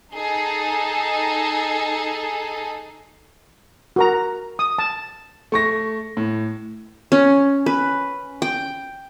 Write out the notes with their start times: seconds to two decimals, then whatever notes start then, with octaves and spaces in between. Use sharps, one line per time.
0.13 D#4 G#4 A4
3.96 F#4 A#4 A#5
4.59 D#6
4.78 A5
5.52 A3 C#6 A#6
6.17 A2
7.12 C#4
7.66 B4
8.42 G5